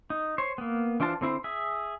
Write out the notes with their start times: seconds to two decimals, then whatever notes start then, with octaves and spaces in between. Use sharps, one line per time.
0.10 D#4
0.38 C5 C#5
0.58 A#3 B3
1.00 E3 D4 F4 C5 A5
1.21 D3 C4 E4 C5
1.44 G#4 E5